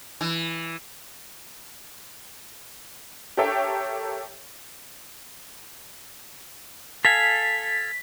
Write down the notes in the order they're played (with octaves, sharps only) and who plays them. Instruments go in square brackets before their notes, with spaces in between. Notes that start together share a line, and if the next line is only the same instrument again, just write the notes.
[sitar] E3
[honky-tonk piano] G4 A4 A#4 C#5 E5 G5
[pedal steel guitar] A4 F5 G#5 [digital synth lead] B6